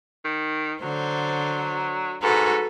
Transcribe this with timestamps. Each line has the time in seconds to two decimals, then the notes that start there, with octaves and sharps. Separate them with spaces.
0.25 D#3
0.82 D3 F#3 C5
2.22 G#2 F#4 A4 B4